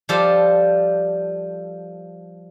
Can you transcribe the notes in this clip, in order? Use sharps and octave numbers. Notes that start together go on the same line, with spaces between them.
F3 G3 G4 A4 C5 A5